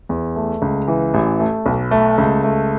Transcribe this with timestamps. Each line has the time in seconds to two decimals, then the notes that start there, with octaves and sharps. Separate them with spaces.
0.09 E2
0.36 A3
0.62 C#2
0.88 E3
1.14 A1
1.40 A3
1.66 B1
1.91 A3
2.18 C#2
2.44 A3